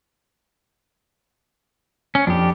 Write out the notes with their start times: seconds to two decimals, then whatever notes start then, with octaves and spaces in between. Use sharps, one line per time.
2.15 C#4
2.27 F2 D4 G4